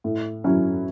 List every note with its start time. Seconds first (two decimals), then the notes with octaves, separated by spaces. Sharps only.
0.04 A2
0.44 F#3 C#4 E4